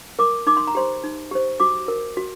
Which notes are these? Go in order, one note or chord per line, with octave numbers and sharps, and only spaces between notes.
A#4 D6
D#4 D6
C6
A#5
G4 C5 C6
D#4
G4 C5
F#4 D6
A#4
F#4